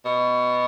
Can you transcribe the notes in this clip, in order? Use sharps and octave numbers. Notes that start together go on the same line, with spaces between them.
B2